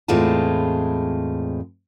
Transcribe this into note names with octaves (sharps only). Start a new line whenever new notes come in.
E2 A2 G#3 C4 F4 A5